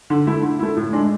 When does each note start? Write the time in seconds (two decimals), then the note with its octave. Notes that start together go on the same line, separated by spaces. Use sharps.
0.10 D3
0.27 A3 E4
0.43 D3
0.59 A3 E4
0.77 A2
0.93 G#3 D4